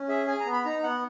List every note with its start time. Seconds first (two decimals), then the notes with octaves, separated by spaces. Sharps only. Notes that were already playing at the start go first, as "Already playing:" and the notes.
Already playing: C#4
0.09 G#4 E5
0.27 G#4 G#5
0.40 A#5
0.46 B3
0.52 B5
0.65 D#4 A#5
0.83 B3 F#5